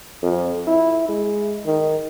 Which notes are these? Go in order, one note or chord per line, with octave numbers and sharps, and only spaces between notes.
F2
E4
G#3
D#3